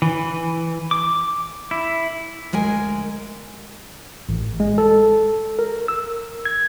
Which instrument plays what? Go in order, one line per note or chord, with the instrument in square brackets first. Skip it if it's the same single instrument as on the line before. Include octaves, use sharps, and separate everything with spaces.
[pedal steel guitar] E3
D6
E4
[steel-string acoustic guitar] D2 G#3 A#4 G#5
[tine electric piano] A1
G#3
A4
A#4
E6
G#6